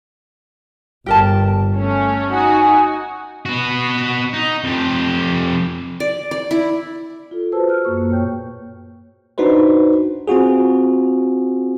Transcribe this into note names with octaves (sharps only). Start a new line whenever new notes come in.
G1 G4 A#4 A5
A3 C#4
D#4 F#4 G#5
B3 F#4
D#4
F2 G4
D5
D5
E4
F4 A4
F#4 G#4 B4 C5 A5 E6
F6 F#6
F#2 A#3 C#6
A#3
A#2 C#5 G5 G6
D4 D#4 F#4 B4 C5
C4 F4 F#4 G#4